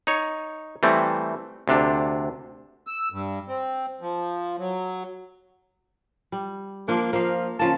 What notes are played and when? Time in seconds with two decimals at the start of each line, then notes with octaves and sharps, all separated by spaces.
0.07 D#4 C#5
0.83 E3 G3 A3 C4
1.68 D2 C3 D4
2.87 E6
3.12 G2
3.48 C4
4.01 F3
4.58 F#3
6.32 G3
6.88 F3 A#3 D4
7.13 F3 A#3 F5
7.59 C#3 F3 A#3 A5